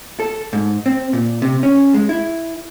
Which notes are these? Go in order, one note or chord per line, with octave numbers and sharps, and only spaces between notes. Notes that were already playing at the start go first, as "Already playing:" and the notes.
A4
G#2
C4
A#2
C3
C#4
G#3
E4